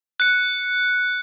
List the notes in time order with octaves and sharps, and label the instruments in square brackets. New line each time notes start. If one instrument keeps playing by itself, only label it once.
[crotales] F#6 C#7